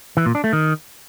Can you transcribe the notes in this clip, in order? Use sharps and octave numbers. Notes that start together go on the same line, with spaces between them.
E3
A#2
D4
A3
D#3